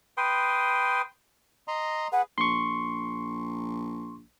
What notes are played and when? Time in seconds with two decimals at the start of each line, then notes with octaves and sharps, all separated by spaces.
0.17 B4 G5 C6 D#6
1.68 D#5 A#5 C6
2.12 G#4 B4 F#5
2.38 A#1 C6 C#6